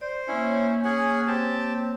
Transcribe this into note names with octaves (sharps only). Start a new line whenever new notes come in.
C5 D5
A#3 C#4 E4 C#5
C#4 G#4 F#5 G#5
C4 G4 A5